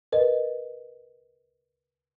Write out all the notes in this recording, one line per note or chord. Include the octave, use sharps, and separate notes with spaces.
A#4 B4 D#5